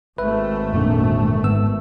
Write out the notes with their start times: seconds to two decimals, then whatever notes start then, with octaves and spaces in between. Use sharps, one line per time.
0.18 G#1 A3 B4 E5
0.73 F2 A#2 D3
1.44 G#2 B3 E6